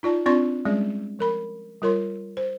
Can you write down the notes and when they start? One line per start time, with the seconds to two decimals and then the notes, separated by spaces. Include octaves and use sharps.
0.03 D#4 F4 D5 A5
0.26 C4 D4 F4 D5 C6 C#6
0.65 G3 G#3 C#4 G#4 D5
1.19 F3 A#4 B5
1.82 G3 F4 A#4 C#5 C6
2.37 C5